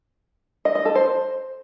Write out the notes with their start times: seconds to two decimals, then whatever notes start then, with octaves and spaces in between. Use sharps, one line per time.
0.65 D#5
0.75 D#5
0.85 A4
0.95 C5